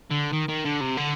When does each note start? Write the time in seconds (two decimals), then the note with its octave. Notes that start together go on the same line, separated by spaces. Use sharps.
0.11 D3
0.33 D#3
0.49 D#3
0.65 D3
0.81 C3
0.97 D3